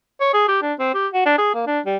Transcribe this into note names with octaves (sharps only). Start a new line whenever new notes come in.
C#5
G#4
G4
D4
C4
G4
F#4
D4
G#4
A#3
D4
G3